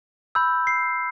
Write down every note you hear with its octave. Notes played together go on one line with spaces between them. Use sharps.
B5 E6 G6
C7